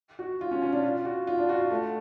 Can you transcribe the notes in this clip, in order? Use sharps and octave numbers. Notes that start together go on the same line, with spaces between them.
F#4
F4
C#4
C#4
D4
F4
F#4
F4
D4
F#4
F4
A3